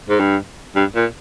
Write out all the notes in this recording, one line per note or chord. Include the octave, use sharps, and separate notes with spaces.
G#2
G2
G2
A#2